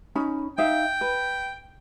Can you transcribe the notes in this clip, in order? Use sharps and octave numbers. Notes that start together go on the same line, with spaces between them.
C#4 D#4 B5
D#4 E5 F5 G5
B4